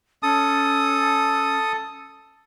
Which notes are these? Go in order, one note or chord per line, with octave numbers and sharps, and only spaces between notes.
C#4 A4 A5 D#6